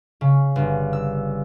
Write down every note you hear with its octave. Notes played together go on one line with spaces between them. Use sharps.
C#3
G1
E6